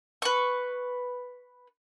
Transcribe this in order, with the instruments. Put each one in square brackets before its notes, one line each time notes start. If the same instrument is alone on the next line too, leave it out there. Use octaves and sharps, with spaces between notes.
[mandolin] B4 C#6